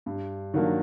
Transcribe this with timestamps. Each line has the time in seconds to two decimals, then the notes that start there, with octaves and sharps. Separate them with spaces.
0.06 G2
0.54 D#3 F#3 A#3 D4